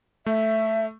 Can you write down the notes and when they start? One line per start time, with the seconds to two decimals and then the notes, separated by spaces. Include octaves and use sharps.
0.26 A3 E5